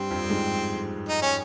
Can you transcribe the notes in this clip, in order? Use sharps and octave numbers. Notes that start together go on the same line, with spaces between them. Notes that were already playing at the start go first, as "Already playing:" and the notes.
Already playing: G2 G3 C4
F2 F3
G3
G#2 G#3
D#4
C#4